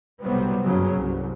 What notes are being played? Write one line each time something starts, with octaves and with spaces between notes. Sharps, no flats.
B1 C3 F#3 G3 B3 C4
F#1 G2 C#3 F#3 C#4
C2